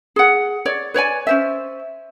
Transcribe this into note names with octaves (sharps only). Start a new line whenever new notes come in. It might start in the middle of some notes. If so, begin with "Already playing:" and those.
G#4 F#5
C#5 D5
B4 C#5 D5 G#5
C#4 C5 E5